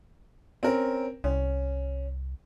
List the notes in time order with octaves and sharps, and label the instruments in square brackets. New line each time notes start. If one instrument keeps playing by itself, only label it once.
[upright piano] C4 C#4 A#4
[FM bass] C2 [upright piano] C#4